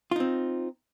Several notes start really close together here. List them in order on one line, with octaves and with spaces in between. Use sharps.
F4 D#4 C4